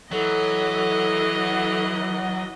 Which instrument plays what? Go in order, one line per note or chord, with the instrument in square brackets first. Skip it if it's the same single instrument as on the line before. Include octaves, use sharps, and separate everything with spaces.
[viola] E3 D#5 [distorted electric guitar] F#3 [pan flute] A4